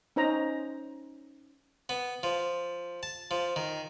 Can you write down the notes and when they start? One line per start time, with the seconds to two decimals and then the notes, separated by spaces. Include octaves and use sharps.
0.16 C#4 D#4 C5 D#5 A#5
1.89 B3
2.23 F3
3.03 A5
3.31 F3
3.56 D#3